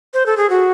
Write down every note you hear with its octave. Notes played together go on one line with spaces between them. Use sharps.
C5
A4
G#4
F#4